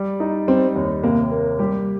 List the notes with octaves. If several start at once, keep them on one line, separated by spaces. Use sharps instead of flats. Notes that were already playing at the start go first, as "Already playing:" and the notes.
Already playing: G3 D5
D#4
G3 C4
D#2
C3 A#3
A#3
G3 G4